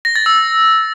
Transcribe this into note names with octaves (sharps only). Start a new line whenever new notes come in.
A#6
A6
E6